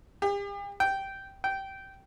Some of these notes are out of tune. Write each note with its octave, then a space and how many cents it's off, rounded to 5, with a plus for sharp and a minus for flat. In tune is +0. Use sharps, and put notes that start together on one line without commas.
G4 +45
G5 -10
G5 -15